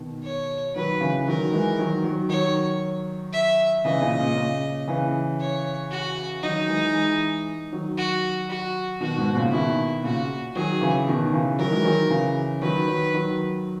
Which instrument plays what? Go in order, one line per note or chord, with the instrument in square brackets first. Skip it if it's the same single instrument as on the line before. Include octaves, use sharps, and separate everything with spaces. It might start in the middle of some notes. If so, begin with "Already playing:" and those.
Already playing: [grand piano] B2 D#3
[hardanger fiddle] C#5
[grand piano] D#3 F#3 [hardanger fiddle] B4
[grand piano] C#3 E3
[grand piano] D#3 F#3 [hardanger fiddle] A#4
[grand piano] E3 G#3
D#3 F#3
D#3 F#3
[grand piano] D#3 F#3 [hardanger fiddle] C#5
[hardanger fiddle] E5
[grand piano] C#3 E3 [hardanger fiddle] D#5
[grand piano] A#2 C#3
A#2
A#2 C#3
C#3 E3
[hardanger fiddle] C#5
F#4
[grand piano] D#3 F#3 [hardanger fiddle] D#4
[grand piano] E3 G#3
E3 G#3
D#3 F#3
[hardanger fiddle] F#4
F#4
[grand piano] B2 D#3 [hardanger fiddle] F#4
[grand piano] G#2 B2
A#2 C#3
[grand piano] B2 D#3 [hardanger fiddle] E4
[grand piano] A#2 C#3 [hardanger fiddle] F#4
[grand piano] D#3 F#3 [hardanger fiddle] G#4
[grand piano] C#3 E3
B2 D#3
C#3 E3
[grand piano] D#3 F#3 [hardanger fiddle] A#4
[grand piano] E3 G#3
D#3 F#3
C#3 E3
[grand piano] D#3 F#3 [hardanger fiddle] B4
[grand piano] D#3 F#3
D#3 F#3